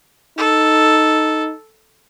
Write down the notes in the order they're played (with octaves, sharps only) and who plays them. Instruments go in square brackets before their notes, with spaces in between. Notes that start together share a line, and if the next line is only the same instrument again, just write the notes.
[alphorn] D#4 [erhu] A4